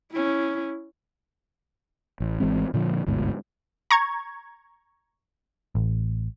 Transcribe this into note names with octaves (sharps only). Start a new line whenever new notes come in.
C#4 E4
A1
G#1 E3 G#3 C4
A#2 D3 F3
G1 D2 G#2 B2
A#5 C#6 G#6
A1